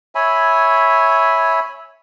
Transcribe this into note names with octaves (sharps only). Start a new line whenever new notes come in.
C#5 E5 G#5 B5